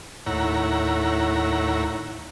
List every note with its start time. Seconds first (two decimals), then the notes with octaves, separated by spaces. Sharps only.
0.26 D#2 A2 E4 C#5 F#5 A#5